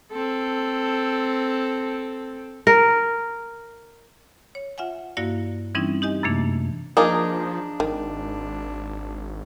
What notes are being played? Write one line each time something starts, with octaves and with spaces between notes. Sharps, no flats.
C4 A4
A#4
C#5
F4 E5 F#5 G#5
G2 A#3 E4 F#4 D5 F5
E3 G3 C4 C#4 D#4 E4
D#4 G4 D#5 G#5
F#2 C3 E3 A3 A#3 D4
F3 A#3 D4 D#4 G#4 A#4 D5
G#1 D#3